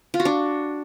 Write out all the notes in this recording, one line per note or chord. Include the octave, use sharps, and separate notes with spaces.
F4
F#4
D4